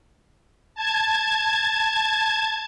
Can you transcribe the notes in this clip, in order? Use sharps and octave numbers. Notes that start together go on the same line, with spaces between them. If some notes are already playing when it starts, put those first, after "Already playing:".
A5 G#6